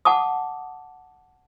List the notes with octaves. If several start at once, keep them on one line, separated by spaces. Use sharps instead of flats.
F#5 A5 D6 D#6